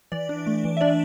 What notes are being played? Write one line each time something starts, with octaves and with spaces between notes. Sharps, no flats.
E3 D5
D4
A3
E3
E5
D4 D5